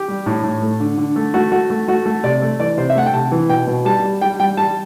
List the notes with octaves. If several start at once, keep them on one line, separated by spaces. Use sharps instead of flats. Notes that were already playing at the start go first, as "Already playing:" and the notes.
Already playing: G4
G3
A2
A2
A3
D3
D3
A3
A3 F#4
A3 F#4
A3
A3 F#4
A3
C3 D5
A3
E3 D5
C3 C5
E5
A3 F#5
G5
C3 A5
E3
B2 G5
B2
G3 A5
G3
G3 G5
G3 G5
G3 A5